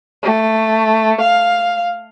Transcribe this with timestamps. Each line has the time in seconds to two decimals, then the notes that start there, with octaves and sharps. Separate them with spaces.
0.23 A3
1.21 F5